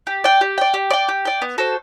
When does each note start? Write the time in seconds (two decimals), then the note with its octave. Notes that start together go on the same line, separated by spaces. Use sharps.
0.07 G4
0.24 D5 G5
0.41 G4
0.58 D5 G5
0.74 G4
0.91 D5 G5
1.09 G4
1.25 D5 G5
1.42 B3
1.58 F#4 A4 C5